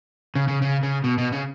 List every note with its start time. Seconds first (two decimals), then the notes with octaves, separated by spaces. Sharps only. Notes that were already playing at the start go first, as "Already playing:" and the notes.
0.35 C#3
0.48 C#3
0.62 C#3
0.83 C#3
1.04 B2
1.18 B2
1.32 C#3